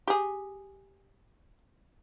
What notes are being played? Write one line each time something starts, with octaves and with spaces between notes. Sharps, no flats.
G4 G#4